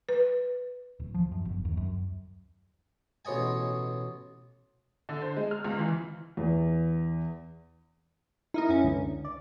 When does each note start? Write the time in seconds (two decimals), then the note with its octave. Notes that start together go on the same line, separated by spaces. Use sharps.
0.09 B4
1.00 D1
1.14 F3
1.32 F#2
1.45 G1
1.65 D#2
1.77 F#2
3.25 A1 B2 C#5 D#5 G#5
5.09 D3
5.22 C5
5.36 G#3
5.51 F6
5.64 C#2
5.79 E3
6.37 E2
8.54 D#4 E4 A#4 D#5
8.69 F#2 C#4
8.84 C#2 D3
9.25 D5